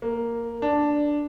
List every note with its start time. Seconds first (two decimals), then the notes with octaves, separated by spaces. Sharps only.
0.02 A#3
0.62 D4